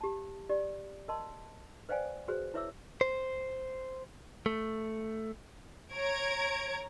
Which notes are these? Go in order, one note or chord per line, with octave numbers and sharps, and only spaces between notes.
G4 A5
G4 D5
A#4 D#5 A5 C6
B4 C5 D5 F5 G5 G#5
F#4 G#4 B4 C5
E4 B4 C#5 E5 D6 E6
C5
A3
C#5 A#5 G#6 D7